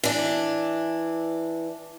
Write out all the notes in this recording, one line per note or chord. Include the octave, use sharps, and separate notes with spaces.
E3 D4